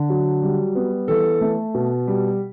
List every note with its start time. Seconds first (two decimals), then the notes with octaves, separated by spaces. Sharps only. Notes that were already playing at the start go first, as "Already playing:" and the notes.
Already playing: D3
0.10 F#3
0.43 G3
0.75 B3
1.08 E3 A4
1.41 A3
1.74 B2
2.07 G3